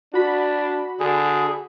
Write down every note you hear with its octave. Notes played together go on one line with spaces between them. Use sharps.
D4 F#4 B5
D3 G#4